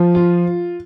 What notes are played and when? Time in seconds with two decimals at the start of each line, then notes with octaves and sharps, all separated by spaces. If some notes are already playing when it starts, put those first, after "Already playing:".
Already playing: F3
0.15 F4